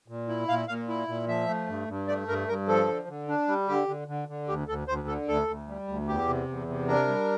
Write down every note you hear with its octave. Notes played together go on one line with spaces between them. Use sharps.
A#2
E4
A#2 F5
A#2 F5
E4
A#2
F3 E5
A3
G2
G2
A3 D5
G2 A#4
G2 A#4
F3 A4
D3
D3
D4
G3
D3 G4
D3
D3
D3
D2 G4
D2 A4
D2 C5
D3 A4
D2 A4
D2
G3
D2
E2 G4
C3
E2
C3
D4 A#4
G3